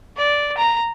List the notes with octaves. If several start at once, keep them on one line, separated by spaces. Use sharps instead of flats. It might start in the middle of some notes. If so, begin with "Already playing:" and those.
D5
A#5